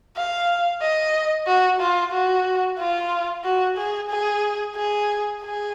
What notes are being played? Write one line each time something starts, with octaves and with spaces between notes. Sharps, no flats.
F5
D#5
F#4
F4
F#4
F4
F#4
G#4
G#4
G#4
G#4